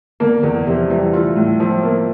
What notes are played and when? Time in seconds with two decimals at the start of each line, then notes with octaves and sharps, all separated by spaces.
0.20 D3 A#3
0.43 E2 D3
0.66 C3 F3
0.90 E3 G3
1.13 A3 F4
1.36 A2
1.60 F3 A3
1.83 A#3